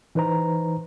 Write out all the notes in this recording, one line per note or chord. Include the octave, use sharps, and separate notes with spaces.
E3 D#4 B4 C5 A#5